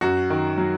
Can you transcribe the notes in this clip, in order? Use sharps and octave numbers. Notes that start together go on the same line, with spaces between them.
F#2 F#4
D#3
F#3